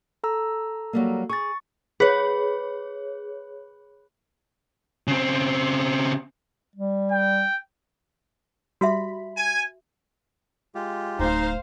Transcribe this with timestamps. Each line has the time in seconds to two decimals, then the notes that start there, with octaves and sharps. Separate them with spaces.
0.24 A4 A#5 E6
0.93 F#3 G3 A#3
1.30 G#4 C#6 A6
2.00 G#4 B4 C#5
5.08 C#3 C4
6.76 G3
7.12 G5
8.81 G3 F#4 E5 B5
9.36 G#5
10.75 G#3 F4 G4
11.19 D1 D#4 C5 F5